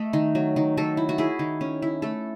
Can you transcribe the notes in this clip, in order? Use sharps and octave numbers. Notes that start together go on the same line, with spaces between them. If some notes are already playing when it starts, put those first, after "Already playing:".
Already playing: A3 D#5
D#3
F#3
D#3
F#3 A4
E4
F#4
E4 G#4
D#3
C#4
E4
A3 A4